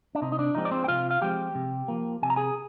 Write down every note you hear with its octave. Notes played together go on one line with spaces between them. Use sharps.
D4
C3 D#4
D#4
D4
F3 G#3 C4 D#4
D5
C4 C5
G5
C3 F4 F5
F5
F3 G#3 C4 G4 G5
C3
F3 A#3
C3 G#5
A#5
G#4 G#5